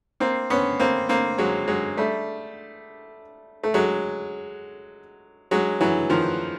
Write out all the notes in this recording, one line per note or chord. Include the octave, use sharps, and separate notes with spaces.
A#3 C4
B3 C#4
A#3 C4
A#3 C4
F#3 G#3
F#3 G#3
G3 A3
A3
F#3 G#3
F#3 G#3
E3 F#3
D#3 F3